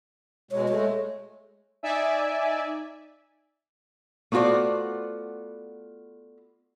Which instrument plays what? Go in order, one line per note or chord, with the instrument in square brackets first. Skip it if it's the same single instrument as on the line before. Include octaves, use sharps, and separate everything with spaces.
[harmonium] B2 G#3 [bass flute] C#5
[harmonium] G#3 A3 [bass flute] C#5
[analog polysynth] D#4 D5 E5 G#5
[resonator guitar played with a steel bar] A3 B3 F4 F#4 C5 D5